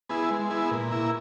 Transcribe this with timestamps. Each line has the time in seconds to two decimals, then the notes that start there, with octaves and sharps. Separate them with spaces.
0.09 B3 E4 G#4
0.31 G#3
0.50 B3 E4 G#4
0.71 A#2
0.91 A#3 E4